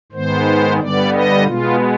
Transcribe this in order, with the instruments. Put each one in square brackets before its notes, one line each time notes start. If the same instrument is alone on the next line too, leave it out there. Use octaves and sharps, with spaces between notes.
[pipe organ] G#2 D#3 G#3 B3 C5
G2 D3 G3 B3 D5
D#5
B2 G#3 B3 F4